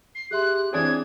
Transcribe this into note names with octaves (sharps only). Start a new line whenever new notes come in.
C7
G4 G#4 E5 C6 F#6
E3 C4 D4 G#4 C#5 G#6